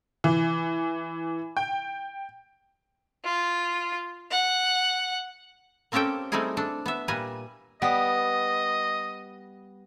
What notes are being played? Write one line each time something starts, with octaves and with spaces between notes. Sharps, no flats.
E3
G5
F4
F#5
A#3 C4 C#4 G4 A4 G5
G3 A3 C4 D#4 E4 G#4
D4 A4
B3 E5
A#2 G3 B4 G#5 A#5
G3 B3 D#5